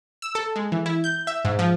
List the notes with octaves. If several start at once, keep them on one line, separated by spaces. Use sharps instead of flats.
E6
A4
G#3
E3
E4
G6
E5
G#2
F3